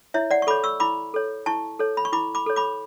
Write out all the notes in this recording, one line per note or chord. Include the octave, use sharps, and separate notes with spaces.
E4 C#5 E5
D5 F#5
C#6
A4 C#5 B5 D6
C#6 E6
E4 B5 D6
A4 C#5
E4 A5 C#6
A4 C#5
B5
C#6
E4 B5 D6
B5 D6
A4 C#5
B5 D6